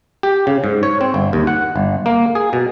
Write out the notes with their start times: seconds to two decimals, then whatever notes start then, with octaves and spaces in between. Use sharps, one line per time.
0.23 G4
0.47 C#3
0.64 G#2
0.83 C#5
1.01 C4
1.14 G1
1.33 D#2
1.47 F#5
1.76 G1
2.06 A#3
2.35 G#4
2.53 B2